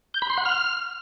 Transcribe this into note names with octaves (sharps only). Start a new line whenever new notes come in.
G6
B5
C6
F#5
F6